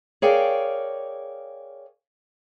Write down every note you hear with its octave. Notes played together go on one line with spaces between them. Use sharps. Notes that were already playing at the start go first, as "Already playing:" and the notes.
G#4 A#4 C#5 D5 F5 G5